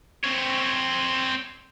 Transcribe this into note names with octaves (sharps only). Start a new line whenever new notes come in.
C4 C#5